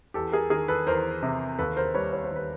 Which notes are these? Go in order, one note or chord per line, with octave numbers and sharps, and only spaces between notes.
E2 G4 A4
G#4 A#4
D#3 G#4 A#4
A4 B4
E2 A#4 C5
C3
D#2 A4 B4
A#4 C5
G3 B4 C#5
C#5
C5
D#2 B4